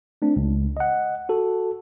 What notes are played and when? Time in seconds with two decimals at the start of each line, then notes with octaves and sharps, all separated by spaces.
0.22 A3 C4 D4
0.36 C#2
0.77 D#5 F#5
1.29 F#4 A4